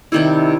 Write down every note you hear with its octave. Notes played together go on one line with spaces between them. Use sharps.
C3 D#3 G3 E4